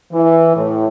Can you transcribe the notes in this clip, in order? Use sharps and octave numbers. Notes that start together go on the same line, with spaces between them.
E3
A2